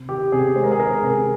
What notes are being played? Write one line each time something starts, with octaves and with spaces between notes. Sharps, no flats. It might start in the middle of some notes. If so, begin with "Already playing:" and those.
Already playing: C3
D#3 G4
C3 G#4
G#3 C5
A#4
G#4
D#3 A#4
C3